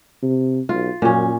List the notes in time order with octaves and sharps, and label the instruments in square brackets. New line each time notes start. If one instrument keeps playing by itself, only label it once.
[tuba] C3
[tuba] B1 [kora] F4
[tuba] F#2 [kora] A#2 C#4